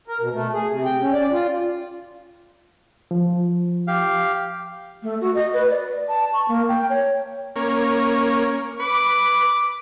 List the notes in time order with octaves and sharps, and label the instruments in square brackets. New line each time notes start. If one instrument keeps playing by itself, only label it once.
[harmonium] A#4
B2
A3
G#4
C3
G5
C#4
D5
F4
[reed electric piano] F3
[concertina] G4 F5
[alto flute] A3
F#4
D#5
B4
D5
A5
C#6
A#3
G5
C#5
[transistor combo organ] A#3 C#4
[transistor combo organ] B4 [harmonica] D6